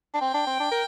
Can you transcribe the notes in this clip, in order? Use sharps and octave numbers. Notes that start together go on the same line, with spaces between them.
D4
C4 G5
D4
C4
D4
A#4